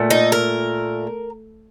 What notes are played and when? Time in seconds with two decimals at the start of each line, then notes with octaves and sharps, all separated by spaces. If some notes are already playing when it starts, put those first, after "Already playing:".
Already playing: A#2 A3
0.10 D#4
0.32 A#4